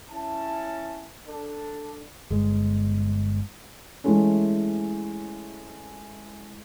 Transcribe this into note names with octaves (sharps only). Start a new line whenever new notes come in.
C#4 E4 A5
D4 A4
G1 G#3
E3 G#3 A3 C#4